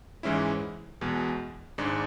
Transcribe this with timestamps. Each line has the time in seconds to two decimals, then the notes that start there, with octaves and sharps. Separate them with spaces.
0.23 G#2 E3 G#3 C#4 E4
1.01 E2 B2 G#3
1.78 G#1 G#2 G#3 D4